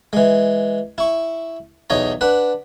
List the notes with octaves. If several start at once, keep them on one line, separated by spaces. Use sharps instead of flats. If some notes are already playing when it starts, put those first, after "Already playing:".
E3 G#3
E4 C#6
B1 E2 D#4 C#5 A#5
D4 B4 F#5